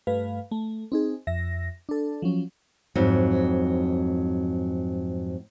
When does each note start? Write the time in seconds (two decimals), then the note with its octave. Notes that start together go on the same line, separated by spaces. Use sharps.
0.07 G2 A3 B4 F5
0.51 A3
0.92 C4 D#4 G#4
1.27 F2 E5 A#6
1.89 D4 A4
2.22 F3 F#3 C#4
2.95 F2 G#2 F#3